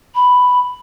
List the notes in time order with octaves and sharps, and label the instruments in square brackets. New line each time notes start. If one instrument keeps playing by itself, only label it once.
[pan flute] B5